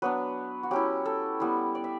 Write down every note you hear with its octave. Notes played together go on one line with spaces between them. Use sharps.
F#3 B3 D4 B4
F#4
F#3 C#4 E4 G4
A4
G3 B3 E4
D5
E5